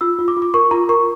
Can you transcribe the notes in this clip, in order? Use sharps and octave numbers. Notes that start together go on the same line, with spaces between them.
F4 E6
F4
D6
F4
D6
A#4 C#6
F4 A#5
A#4 C#6